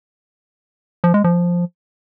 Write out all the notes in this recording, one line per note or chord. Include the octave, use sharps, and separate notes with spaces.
F3
G#3
F3